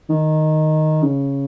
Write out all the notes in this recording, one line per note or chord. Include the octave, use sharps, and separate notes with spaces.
D#3
C#3